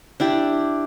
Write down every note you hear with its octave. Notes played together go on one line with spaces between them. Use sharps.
D4 E4 G4